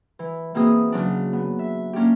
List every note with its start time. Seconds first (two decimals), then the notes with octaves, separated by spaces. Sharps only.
0.19 E3
0.54 B2 E3 A#3 C4 G#4 D#6
0.92 C#3 F#3 D4
1.33 B3
1.59 E5
1.93 A#3 C#4 D4 G4